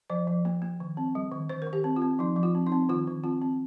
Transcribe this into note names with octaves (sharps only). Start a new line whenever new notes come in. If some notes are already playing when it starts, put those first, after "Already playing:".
F3 C5
F3
A#3
A#3
D#3
C4
G3
D#3
D#3 C5
A#4
D#3
G4
C4
F4
C4
F3 D#4
F3
F4
C4
D#4
C4
D#3 F4
D#3
C4 F4
C4